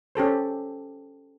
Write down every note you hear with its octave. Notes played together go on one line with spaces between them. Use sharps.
C#4 G4 A4 C5